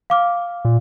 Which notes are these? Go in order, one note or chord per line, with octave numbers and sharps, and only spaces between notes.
F5 D6 F6
A#2